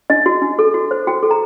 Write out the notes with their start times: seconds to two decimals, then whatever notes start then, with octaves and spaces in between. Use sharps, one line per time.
0.10 D4 D#5
0.26 F#4
0.42 D4
0.59 A4
0.74 F#4
0.91 C5
1.07 F#4 G5
1.23 A4
1.31 A#5